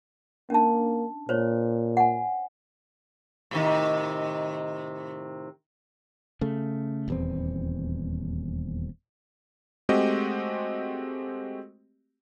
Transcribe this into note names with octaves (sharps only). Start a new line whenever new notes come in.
A#3 C#4 D4 A5
A#2 C5 C#5
F#5 G#5
A2 C3 D#3
C#3 A3
D#1 E2 C4
G#3 A3 C4 F#4 G4 D#5